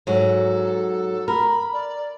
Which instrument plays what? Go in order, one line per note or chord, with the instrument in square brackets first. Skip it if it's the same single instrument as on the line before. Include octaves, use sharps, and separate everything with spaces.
[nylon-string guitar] G#2 F#3 [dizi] A4
[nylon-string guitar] A#4 [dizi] B5
[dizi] D5